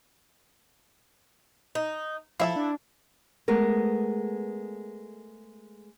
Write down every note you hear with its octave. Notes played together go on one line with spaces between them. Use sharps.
D#4
F3 E4 A4 E5 F5
D4
G#3 A3 B3 A#4